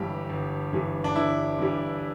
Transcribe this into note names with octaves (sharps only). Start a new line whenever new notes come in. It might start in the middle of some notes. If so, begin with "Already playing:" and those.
Already playing: G1 G2 E3 G3 G4
G1
G2 E3 G3
D4
G1 E4
G2 E3 G3